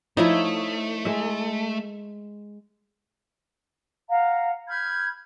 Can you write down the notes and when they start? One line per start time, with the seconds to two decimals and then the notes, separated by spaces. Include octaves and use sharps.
0.17 F3 A3 D#4 E4 C#5 D#5
1.05 G#3 E5
4.08 F5 F#5 A#5
4.68 B5 F6 G6 G#6